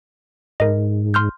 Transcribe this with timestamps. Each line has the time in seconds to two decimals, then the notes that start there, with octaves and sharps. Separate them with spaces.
0.60 G#2 A#4 D#5
1.14 C6 F6 G6